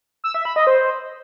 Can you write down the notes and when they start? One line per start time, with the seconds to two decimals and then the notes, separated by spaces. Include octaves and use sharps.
0.24 E6
0.34 E5
0.45 B5
0.56 D#5
0.67 C5